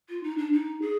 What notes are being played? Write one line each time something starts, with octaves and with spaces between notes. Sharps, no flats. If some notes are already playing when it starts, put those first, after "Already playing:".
F4
D#4
D4
D#4
G#4